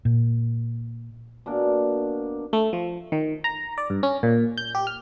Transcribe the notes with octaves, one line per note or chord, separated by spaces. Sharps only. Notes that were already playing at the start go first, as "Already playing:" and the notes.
A#2
B2 A#3 D4
A3
F3
D#3
A#5
D5
G2
C#4
A#2
G6
G4
F6